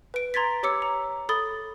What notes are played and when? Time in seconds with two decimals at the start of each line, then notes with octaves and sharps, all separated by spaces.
0.14 B4 D7
0.34 A#5 C6 G#6 A6 B6
0.63 G4 C#5 D6 E6 C#7
0.82 A#5
1.29 A4 B5 D#6 A6 G7